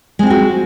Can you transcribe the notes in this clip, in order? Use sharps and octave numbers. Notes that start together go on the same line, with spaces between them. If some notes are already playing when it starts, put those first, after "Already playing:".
G#3 C4 F#4 G#4